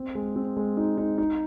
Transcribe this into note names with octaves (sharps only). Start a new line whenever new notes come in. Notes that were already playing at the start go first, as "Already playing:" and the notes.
Already playing: C4
G#3
C4
G#3
D#4
D#4
D#4